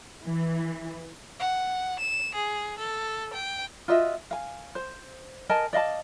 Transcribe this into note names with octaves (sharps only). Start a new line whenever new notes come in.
E3
F#5
E7
G#4
A4
G5
F4 F#4 D#5 E5
F5 G#5
C5
A#4 D#5 G#5 A5
D5 D#5 F5 A5